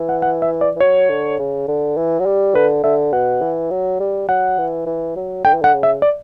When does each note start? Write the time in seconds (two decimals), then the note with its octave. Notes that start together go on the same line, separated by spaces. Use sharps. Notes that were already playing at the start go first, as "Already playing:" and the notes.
Already playing: E3
0.09 F#5
0.22 F#5
0.42 E5
0.61 D5
0.76 E3
0.80 F#3 C#5
1.09 D3
1.39 C#3
1.68 D3
1.97 E3
2.19 F#3
2.26 G3
2.55 D3 B4
2.84 D3 E5
3.13 B2 F#5
3.41 E3
3.71 F#3
4.00 G3
4.29 F#3 F#5
4.58 E3
4.86 E3
5.16 F#3
5.45 D3 G5
5.53 E3
5.61 D3 F#5
5.74 C#3
5.83 E5
6.02 D5